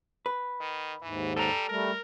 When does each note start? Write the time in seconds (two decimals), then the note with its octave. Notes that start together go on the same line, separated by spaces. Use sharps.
0.26 B4
0.61 D#3
1.02 D#2 G#2 E3
1.36 G3 A4 A#5
1.69 G3 A3 A#4